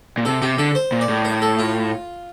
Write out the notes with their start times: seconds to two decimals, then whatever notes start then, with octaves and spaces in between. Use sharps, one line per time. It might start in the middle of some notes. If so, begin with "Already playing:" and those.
0.18 A#2
0.25 C3 A4
0.42 C3 G4
0.58 D3 A4
0.75 C5
0.92 A#2
1.01 D5
1.09 A2
1.25 A#4
1.42 A4
1.59 F4